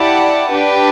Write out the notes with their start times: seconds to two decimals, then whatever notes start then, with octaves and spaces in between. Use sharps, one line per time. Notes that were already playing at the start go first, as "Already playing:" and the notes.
Already playing: E4 G4 D5 F#5 A5
0.50 D4 G4 B4